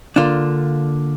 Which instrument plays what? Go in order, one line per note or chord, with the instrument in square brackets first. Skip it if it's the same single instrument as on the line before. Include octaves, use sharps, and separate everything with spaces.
[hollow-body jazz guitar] D3 A#3 D4 F4